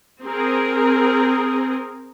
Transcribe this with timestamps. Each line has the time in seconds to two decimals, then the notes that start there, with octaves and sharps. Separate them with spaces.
0.24 C4 G#4 A#4